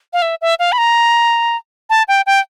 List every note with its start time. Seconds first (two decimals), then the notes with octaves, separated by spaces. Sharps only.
0.13 F5
0.22 E5
0.41 E5
0.59 F5
0.72 B5
0.78 A#5
1.90 A5
2.08 G5
2.27 G5